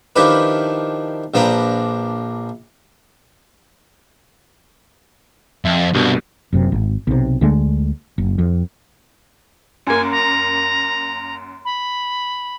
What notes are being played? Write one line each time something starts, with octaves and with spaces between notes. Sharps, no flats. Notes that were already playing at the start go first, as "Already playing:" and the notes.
D#3 F3 D4 E4 G4 B4
A#1 F3 D4 B4 G5 A#5
F2 E5
C2 G2 B2
F#1 F#2 C3
G#1
B1 C3
D2 D3 G#3 A3
F#1
F2
F#2 A#3 G#5
A#5
B5